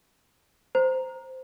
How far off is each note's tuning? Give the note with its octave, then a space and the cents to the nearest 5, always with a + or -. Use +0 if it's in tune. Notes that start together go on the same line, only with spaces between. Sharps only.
C5 -10 A#5 +0